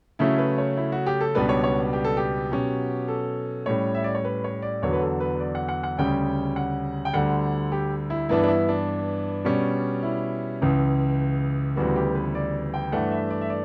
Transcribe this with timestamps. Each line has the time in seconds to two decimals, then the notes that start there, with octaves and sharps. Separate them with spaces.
0.19 C#3 F#3 A3 C#4 E4
0.38 B4
0.58 C#5
0.77 E4
0.92 F#4
1.06 G4
1.21 A4
1.35 C#2 B2 G3 B3 D4 B4
1.49 C#5
1.64 C#5
1.93 G4
2.04 A4
2.17 G4
2.51 B2 F#3 C#4
3.08 A4
3.66 A2 G3 C#4 C#5
3.95 E5
4.04 D5
4.15 C#5
4.24 B4
4.44 C#5
4.62 D5
4.82 E2 D3 F#3 B3 C#5
4.93 B4
5.02 A4
5.20 B4
5.40 D5
5.55 F#5
5.69 F#5
5.83 F#5
5.98 D2 C#3 G3 C#4 G5
6.56 F#5
7.05 G5
7.13 D2 D3 G3 F#5
7.72 G4
8.10 E4
8.29 G2 E3 B3 D4 E4
8.43 D4
8.48 E4
8.69 D4
9.45 B2 G3 C#4
10.03 E4
10.62 C#2 C#3 E3
11.76 D2 C#3 E3 G3 B3 F#4
11.96 G4
12.15 B4
12.35 D5
12.74 G5
12.92 G2 E3 A3 D4 F#5
13.11 E5
13.30 D5
13.41 E5
13.50 D5